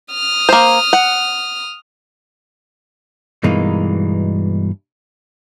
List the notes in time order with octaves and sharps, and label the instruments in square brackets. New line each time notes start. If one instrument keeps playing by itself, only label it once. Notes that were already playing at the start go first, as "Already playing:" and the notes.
[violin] D#6 F6
[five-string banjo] A#3 C5
F#5
[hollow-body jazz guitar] G2 B2 E3 G#3 A#3 D#4